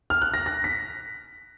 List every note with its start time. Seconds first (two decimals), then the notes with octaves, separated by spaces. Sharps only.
0.10 F6
0.22 F#6
0.34 A#6
0.46 A#6
0.64 B6